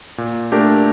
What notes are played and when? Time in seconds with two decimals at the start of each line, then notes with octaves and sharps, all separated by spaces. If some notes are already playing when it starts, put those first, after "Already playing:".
0.18 A#2
0.52 A3 D4 G4 A#4